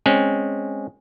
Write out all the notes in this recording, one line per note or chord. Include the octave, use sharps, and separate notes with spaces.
G#3 C4 C#4